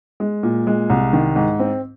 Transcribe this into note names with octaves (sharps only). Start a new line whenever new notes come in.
G#3
A#2
G#3
C2
D#3
G#2
C4